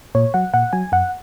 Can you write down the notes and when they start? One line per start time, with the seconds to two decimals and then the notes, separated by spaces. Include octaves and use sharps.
0.15 A#2 C#5
0.34 F#3 F#5
0.54 A#2 F#5
0.73 F#3 G#5
0.92 F#2 F#5